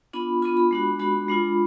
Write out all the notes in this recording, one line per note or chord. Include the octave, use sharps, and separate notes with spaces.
B3 D4 F4 B5
B3 D4 F4 B5
B5
G#3 D4 F#4
G#3 D4 F#4 B5
G#3 D4 F4